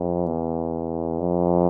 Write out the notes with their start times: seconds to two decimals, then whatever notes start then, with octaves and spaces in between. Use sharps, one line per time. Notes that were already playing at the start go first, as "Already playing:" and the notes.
Already playing: F2
0.26 E2
1.20 F2